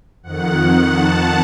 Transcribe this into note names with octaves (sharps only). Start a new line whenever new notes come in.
F2 D#3 F#5
A5